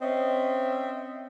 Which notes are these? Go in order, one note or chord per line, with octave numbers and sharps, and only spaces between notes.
C4 C#4 C5 D#5 E5